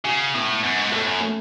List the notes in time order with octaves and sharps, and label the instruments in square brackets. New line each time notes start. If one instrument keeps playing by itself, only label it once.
[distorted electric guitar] C#3 [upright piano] F#4
[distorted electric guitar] A2 [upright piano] B3
[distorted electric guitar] F#2 [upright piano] B3
[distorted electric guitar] G#2
[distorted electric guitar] A2 [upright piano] A4
[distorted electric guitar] F#2
[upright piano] A3